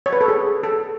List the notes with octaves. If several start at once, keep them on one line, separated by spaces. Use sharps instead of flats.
C#5
B4
A4
G#4
A4